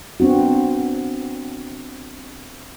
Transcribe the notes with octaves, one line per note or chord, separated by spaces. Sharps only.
B3 C4 D4 F#4